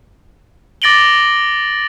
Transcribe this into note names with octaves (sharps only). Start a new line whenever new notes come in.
D6 A6 A#6 D7 F#7 G7